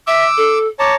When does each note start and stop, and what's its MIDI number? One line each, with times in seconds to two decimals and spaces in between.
0.07 0.25 76
0.07 0.58 86
0.07 0.58 88
0.37 0.66 69
0.79 0.95 73
0.79 0.95 81
0.79 0.95 82
0.79 0.94 86